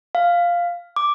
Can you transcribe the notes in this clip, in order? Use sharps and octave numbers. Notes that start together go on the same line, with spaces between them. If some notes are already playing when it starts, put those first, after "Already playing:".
F5
D6